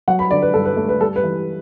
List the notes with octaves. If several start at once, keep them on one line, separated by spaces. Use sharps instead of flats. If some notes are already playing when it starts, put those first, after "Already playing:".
F#3 F#5
B5
D3 D5
B4
G2 A4
B4
A3
B4
G3 A4
B4
E3